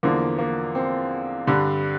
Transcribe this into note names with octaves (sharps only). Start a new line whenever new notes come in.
E2 D3 F3 A#3
A#3
C4
G2 D3 G3